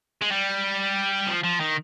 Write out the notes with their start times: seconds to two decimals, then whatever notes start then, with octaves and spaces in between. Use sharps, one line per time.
0.21 G#3
0.31 G3
1.28 F3
1.44 F3
1.60 D#3